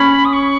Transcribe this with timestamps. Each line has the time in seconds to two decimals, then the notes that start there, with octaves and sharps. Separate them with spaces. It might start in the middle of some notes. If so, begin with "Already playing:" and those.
Already playing: C#4 B5
0.24 D#6
0.32 C#6